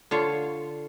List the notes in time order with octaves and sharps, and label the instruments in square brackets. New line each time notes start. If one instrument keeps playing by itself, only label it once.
[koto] D3 F4 C#5